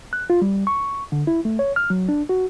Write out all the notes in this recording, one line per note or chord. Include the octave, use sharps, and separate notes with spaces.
F#6
F4
G3
C#6
D3
E4
A3
C#5
F6
F#3
D4
F#4